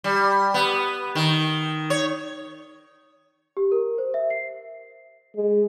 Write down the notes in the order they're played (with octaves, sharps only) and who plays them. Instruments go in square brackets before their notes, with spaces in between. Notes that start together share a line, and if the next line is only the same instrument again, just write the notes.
[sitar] G3
B3
D#3
C#5
[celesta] G4
A#4
C5
E5
C7
[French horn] G#3